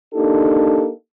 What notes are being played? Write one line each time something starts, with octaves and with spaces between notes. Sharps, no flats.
A#3 D4 D#4 G4 A4